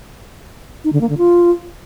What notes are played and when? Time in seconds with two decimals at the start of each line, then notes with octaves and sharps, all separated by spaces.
0.84 D#4
0.93 D3
1.01 A#3
1.09 D3
1.18 F4